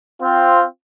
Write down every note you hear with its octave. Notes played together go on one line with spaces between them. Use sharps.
C4 F4